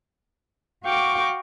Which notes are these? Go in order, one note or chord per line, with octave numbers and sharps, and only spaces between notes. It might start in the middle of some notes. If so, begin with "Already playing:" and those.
F#4 F5 G5 C#6 D6